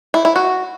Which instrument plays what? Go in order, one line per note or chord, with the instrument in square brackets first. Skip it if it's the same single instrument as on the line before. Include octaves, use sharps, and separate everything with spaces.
[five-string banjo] E4
E4
F#4